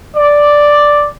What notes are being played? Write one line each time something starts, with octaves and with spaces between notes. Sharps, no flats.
D5